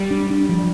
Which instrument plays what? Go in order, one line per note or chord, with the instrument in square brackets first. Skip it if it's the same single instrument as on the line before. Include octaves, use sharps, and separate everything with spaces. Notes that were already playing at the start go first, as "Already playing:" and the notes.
Already playing: [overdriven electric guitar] G3
[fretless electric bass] D4
D4
F3